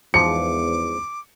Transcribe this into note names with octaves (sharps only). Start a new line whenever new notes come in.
E2 G#2 F3 D6 C#7